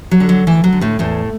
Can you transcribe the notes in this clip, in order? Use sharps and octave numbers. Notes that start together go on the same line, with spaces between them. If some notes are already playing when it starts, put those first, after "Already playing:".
F#3
D3
F#3
D2 E3
F#3
D3
A2 A3
E2 A2 A3